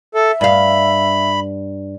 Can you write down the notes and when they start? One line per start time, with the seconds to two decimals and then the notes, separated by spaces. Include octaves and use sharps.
0.14 A4 E5
0.41 G2 F5 B5